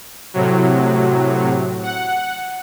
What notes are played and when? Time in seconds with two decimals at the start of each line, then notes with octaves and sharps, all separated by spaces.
0.34 A2 C3 F#3
1.83 F#5